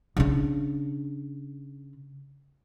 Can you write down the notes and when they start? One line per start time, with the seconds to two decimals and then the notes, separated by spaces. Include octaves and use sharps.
0.17 C#3 D4